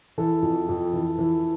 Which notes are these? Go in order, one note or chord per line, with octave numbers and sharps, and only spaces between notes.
E3 A4
F2
F2
E3
E3